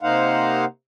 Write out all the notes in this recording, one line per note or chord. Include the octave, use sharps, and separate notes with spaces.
C3 A#3 D#4 C5 F5 F#5